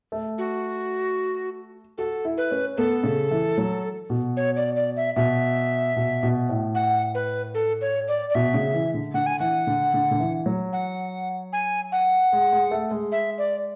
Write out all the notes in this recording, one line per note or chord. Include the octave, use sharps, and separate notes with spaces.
A3
F#4
F#4 A4
E4
B4
C#4
B3 A4
C#3
E3
F#3
B2
C#5
D5
D5
E5
B2 E5
B2
B2
A2
F#5
B4
A4
C#5
D5
D5
B2 E5
C#3
E3
D3
D3 F#5
G#5
E3 F#5
D3
D3
D3
E3
F#3
F#5
G#5
F#5
G#3
G#3
A3
G#3
E5
D5